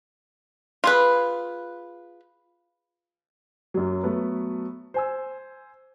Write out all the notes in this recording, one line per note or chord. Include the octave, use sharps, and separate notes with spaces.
F4 G#4 B4
F#2 F#3
F#3 A3 B3 B4
C5 G#5 E6